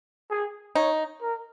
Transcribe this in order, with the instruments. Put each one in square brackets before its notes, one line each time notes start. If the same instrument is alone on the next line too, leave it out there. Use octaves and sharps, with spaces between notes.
[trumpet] G#4
[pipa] D#4 [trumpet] C#5
[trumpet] A#4